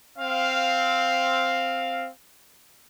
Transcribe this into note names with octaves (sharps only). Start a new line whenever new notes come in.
C4 F5